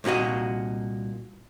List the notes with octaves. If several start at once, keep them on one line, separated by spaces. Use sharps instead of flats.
C2 A#2 D#4 F#4 D#5